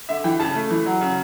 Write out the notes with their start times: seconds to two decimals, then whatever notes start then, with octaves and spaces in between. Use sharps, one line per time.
0.09 D3 E5
0.24 E3 G5
0.40 C#3 A5
0.55 A3
0.70 E3
0.86 F#3
1.01 C#3